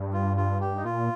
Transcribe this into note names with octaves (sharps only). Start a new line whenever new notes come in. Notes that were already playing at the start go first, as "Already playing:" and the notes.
Already playing: G2
F4
F4
G4
D#4
A#2 F4